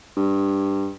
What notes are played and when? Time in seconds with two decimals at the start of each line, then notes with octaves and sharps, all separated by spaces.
0.17 G2